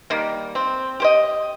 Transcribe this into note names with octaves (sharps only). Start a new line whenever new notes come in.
D#3 G3 A#3
C4
G4 C5 D#5